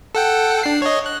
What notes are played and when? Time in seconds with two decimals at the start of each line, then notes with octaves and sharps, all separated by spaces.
0.15 A4 F#5 G5
0.63 D4 C7
0.82 C#5 D#5
1.06 F#6